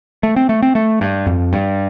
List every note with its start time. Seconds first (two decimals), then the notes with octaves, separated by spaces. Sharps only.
0.23 A3
0.36 C4
0.49 A3
0.62 C4
0.75 A3
1.01 G2
1.27 F2
1.53 G2